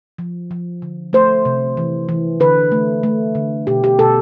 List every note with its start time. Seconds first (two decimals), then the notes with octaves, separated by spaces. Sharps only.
0.19 F3
0.51 F3
0.82 D3
1.13 A3 C5
1.45 C3
1.77 E3
2.09 E3
2.40 D3 B4
2.72 A3
3.03 A3
3.35 D3
3.67 B2 G4
3.84 G4
3.99 B2 A4